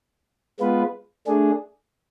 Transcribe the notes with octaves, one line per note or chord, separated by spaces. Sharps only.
G#3 B3 F4 B4
A3 D4 G#4